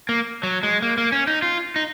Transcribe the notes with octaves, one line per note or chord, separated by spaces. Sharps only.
A#3
F#3
G#3
A#3
A#3
C#4
D#4
F4
D#4